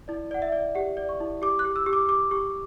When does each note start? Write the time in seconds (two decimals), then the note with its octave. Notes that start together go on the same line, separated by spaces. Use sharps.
0.08 E4 D5
0.31 D5 F#5
0.42 E5
0.52 D5
0.75 G4 F#5
0.97 D5
1.09 C#6
1.20 E4
1.42 G4 D6
1.59 F#6
1.65 G4
1.76 E6
1.86 G4
1.93 D6
2.09 G4 D6
2.31 G4 C#6